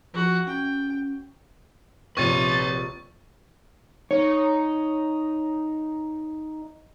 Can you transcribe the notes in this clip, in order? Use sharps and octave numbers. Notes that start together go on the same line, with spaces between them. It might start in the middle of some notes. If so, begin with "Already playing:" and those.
F3 F#4 F#5
C#4 G5
A#1 C3 B4 C#5 C#6 A6 D#7
D#4 C#5